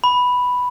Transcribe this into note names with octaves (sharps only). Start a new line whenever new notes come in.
B5